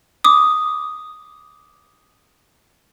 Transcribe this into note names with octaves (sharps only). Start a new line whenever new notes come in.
D6 D#6